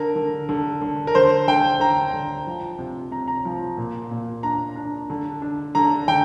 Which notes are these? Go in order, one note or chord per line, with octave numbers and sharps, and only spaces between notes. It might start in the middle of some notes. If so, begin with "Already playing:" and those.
Already playing: D3 A#4
D3
D3
D3
A#4
D3 C5
D3 G5
D3 A#5
D3
F3
C3
C3 A#5
A#5
F3
A#2
A#2
D4 A#5
D4
D3
D4
D3 A#5
D3 G5